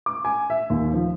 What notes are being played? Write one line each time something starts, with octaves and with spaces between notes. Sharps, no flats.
D6
G#5
E5
D#2
F3